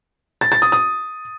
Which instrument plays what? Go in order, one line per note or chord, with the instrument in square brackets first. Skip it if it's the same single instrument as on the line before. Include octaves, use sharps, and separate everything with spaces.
[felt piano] A6
A6
D#6
D#6